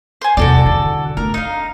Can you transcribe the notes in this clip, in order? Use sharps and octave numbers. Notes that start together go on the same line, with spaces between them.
C5 G#5
E2 C3 F#4 A4 D5
D3
A3 D4 A#4
D#4 F5